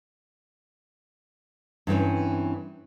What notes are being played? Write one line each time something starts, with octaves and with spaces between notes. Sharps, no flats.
G2 E3 C4 C#4